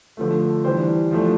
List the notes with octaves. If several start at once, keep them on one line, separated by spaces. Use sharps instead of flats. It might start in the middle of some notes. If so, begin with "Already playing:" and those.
D3 F3 A3
E3 G3 D4 G4 C5
F3 A3 D4